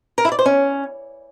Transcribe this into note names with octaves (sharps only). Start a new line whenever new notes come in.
A#4
E4
D5
C5
C#4